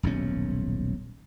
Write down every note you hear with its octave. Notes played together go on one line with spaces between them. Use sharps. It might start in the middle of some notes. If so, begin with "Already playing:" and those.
D#1 B1 G#2 C#4